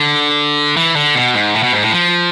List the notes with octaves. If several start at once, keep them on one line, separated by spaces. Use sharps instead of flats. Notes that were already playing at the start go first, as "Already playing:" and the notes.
Already playing: D3
E3
D3
B2
G#2
A2
B2
G#2
A2
F3